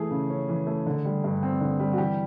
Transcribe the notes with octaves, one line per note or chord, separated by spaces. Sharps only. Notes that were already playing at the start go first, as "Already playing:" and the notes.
Already playing: E3 A3 G#4
C#3
C#4
E3
A3
D3
G3
G2
C4
D3
G3
F#4
E3 G4